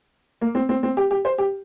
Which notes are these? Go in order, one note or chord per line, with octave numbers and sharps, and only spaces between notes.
A#3
C4
C4
C4
G4
G4
C5
G4